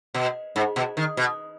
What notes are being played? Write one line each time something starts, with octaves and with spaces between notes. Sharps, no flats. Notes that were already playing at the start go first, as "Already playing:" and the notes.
B2
G#2
B2
D#3
B2